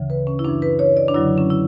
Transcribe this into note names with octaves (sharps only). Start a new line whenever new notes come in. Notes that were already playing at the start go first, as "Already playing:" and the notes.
Already playing: D2 C#3 E3
B4
C#4
E4
F#2 E3 D4
B4
C#5
D5
D4
F#2 D3 F#3 E4
C#4
E4